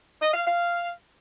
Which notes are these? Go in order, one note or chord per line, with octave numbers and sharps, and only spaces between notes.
D#5
F5
F5